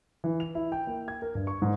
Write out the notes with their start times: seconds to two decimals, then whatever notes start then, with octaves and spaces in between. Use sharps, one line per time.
0.24 E3
0.40 F7
0.55 E4
0.72 G5
0.87 A#3
1.08 G#6
1.22 A#4
1.35 G2
1.47 C#6
1.62 G#2